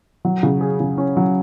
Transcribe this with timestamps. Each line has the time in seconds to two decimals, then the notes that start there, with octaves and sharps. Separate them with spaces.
0.25 F#3
0.43 C#3
0.61 G#4
0.80 C#3
0.98 C#4
1.17 F#3